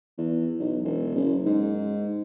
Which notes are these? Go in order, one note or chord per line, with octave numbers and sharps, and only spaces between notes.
E2
B1
E1
F#1
G#2